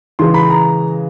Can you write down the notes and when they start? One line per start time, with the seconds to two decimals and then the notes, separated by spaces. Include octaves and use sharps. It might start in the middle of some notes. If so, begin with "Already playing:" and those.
0.19 C#3 E3 G#3 C6
0.34 B5
0.50 A#5